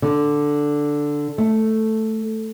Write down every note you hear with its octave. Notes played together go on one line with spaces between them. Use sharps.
D3
A3